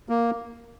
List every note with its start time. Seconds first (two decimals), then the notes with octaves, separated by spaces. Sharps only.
0.09 A#3